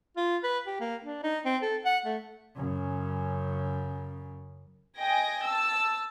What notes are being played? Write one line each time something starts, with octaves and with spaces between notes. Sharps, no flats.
F4
B4
G4
A#3
D4
D#4
C4
A4
F#5
A3
F#2 C#3
D#5 G5 G#5 A#6
A5 E6